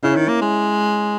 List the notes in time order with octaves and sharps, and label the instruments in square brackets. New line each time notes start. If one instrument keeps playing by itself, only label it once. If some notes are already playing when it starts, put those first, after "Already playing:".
[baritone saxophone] C#3 [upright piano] C#4 E4
[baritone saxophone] D#3
A#3
G#3